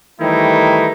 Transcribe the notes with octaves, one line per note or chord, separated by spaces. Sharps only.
D#3 E3 G3 A3 D#4 E4